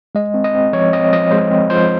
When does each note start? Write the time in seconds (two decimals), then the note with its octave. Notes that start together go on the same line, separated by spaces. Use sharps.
0.15 G#3 D#5
0.34 C4
0.44 D#5
0.55 C4
0.73 F3 C#5
0.93 C4 D#5
1.13 F3 D#5
1.31 G#3 C5
1.51 C4
1.70 F3 C5